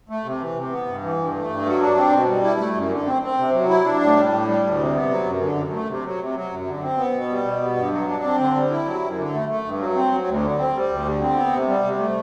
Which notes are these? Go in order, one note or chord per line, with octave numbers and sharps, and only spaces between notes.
A3
C3
E3
C3
B3
G2
E3
G2
A3
G2
F#3
D4
C4
B2
G3
E4
A3
F#2
D3
C4
C4
C3
F#3
E4
D4
A2
G3
A2
G3
D2
C3
B3
F#3
F#2
D3
F#2
A3
C3
F#3
C3
F#3
F#2
D3
C4
B3
B2
G3
B2
B3
G2
F#3
D4
C4
D3
G3
E4
F#3
F#2
D3
A3
A3
G2
F#3
C4
F#3
D2
D3
C4
G3
D2
D3
C4
B3
C3
G3
C3
A3